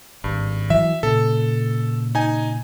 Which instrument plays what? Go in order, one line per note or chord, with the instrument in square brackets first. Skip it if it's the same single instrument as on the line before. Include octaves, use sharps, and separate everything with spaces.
[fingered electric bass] G#1 [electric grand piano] G2
[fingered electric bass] E3 F#3 [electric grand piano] E5
[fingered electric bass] A#2 C#3 [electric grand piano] A4
[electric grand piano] D#4 G#5